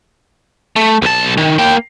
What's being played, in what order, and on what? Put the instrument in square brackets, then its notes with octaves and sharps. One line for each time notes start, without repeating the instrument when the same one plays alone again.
[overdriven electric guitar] A3
B1 A5
D#3
A#3 G5